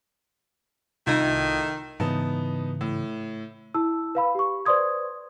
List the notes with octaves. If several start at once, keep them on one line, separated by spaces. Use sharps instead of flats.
C2 A2 D#3 D#4 F4 G#6
G#2 C#3 E3 B3 D#4 A5
A2
E4 A5 E6
B4 F5 B5
G4 C#6
B4 C5 D5 C6 D#6 G#6